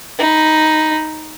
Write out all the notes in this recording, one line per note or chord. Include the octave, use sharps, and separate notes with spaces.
D#4 B5